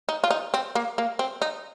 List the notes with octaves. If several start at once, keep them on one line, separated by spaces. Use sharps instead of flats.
D#4
F4
D#4
C4
A#3
A#3
C4
D#4